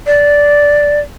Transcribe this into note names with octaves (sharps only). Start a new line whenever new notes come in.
D5